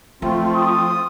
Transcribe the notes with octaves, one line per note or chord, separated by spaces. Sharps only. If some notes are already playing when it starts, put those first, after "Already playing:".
F3 A3 C4 F4
D#6